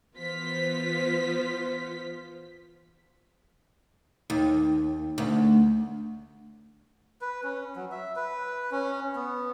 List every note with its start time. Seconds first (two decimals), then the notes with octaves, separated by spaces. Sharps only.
0.15 E3 B3 F4 C5 B6
4.30 D#2
5.18 D2
7.21 B4
7.43 C#4
7.76 F#3
7.91 E5
8.16 B4
8.71 C#4
9.16 B3